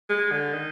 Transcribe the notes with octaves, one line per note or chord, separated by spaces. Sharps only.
G#3
D3
D#3